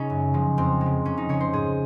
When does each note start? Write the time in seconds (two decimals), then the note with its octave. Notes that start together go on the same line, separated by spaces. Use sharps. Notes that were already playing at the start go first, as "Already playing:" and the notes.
Already playing: C#3 C#4 D#4
0.10 F#2
0.34 C#3 F3 G#3
0.58 F2 C4
0.81 G#3
0.86 C#3
1.05 F2 C#4
1.17 D#4
1.29 C#3 G#3 C#5
1.41 C5
1.53 G#2 G#4